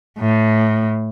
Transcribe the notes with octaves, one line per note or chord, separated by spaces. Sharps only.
A2